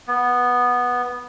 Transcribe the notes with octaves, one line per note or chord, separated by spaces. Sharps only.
B3